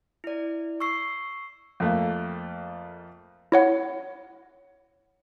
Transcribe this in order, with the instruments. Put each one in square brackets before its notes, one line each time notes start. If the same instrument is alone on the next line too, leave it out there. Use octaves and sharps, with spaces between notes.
[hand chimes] E4 D5
C#6 E6 C7
[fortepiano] F2 A3 A#3
[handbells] E4 C#5 F#5